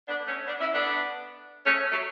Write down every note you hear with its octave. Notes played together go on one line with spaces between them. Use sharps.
B3 D4
A3 C#4
B3 D4
C#4 E4
B3 D4
A3 C#4
F#3 A3